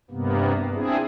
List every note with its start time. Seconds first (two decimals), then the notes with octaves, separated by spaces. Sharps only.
0.11 G2 C3 A#3 B3
0.74 C4 D4 E4 G#4